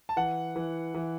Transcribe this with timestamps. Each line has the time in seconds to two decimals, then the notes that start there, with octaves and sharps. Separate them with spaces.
0.09 A5
0.17 E3 F#5
0.56 E3
0.94 E3